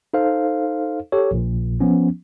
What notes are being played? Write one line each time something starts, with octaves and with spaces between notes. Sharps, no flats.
D#4 A4 C5 F5
G4 A4 C#5
A#1 A#2
F3 B3 C#4